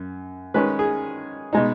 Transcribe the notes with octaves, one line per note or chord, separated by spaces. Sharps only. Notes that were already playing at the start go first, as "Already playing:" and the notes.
Already playing: F#2
D#3 G#3 C#4 B4
G#4
B2 G#3 D#4